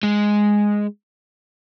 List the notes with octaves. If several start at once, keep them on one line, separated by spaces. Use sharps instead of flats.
G#3